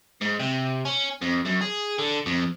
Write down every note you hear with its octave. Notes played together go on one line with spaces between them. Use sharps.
G#2
C3
C#4
F2
F#2
G#4
D3
F2